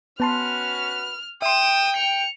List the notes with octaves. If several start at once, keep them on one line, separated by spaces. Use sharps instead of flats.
B3 C#4 F#4 B4 A5 C6 F6
E5 G5 C6 D#6 E7
C#7 F7